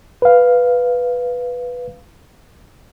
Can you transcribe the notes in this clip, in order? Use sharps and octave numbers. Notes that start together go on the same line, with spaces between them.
B4 F5